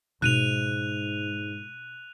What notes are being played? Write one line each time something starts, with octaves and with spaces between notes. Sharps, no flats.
G#2 B2 D#4 F#6 D#7 F7